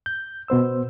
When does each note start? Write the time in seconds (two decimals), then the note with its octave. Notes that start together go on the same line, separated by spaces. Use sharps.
0.06 G6
0.48 B2 B3 C5 E6